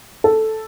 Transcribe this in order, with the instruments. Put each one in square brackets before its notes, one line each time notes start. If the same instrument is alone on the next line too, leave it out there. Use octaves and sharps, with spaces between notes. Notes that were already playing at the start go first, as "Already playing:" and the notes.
[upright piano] A4